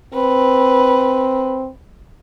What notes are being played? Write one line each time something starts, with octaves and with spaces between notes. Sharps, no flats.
C4 B4